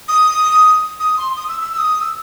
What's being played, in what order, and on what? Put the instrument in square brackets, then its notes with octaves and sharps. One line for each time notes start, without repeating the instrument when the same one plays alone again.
[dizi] D#6
D#6
C6
D#6
E6
E6
E6
D#6
E6